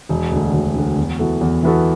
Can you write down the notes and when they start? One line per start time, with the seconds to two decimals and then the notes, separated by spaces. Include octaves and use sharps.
0.09 E1
0.32 D2 D3
0.53 E1
0.76 D2 D3
0.97 E2
1.19 E3 B3 F#4 A4
1.41 E2
1.63 E3 B3 F#4 A4